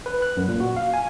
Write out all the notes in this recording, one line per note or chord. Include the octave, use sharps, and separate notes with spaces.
B4
F#6
F#2
A#2
F#4
F5
G#5